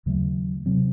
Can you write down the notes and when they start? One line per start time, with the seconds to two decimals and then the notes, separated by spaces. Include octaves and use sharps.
0.06 D#2 C#3 F#3 A3
0.66 C3 F#3 C4